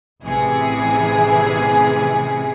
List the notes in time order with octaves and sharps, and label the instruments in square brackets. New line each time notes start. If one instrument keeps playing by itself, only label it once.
[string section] A1 C3 E3 G#4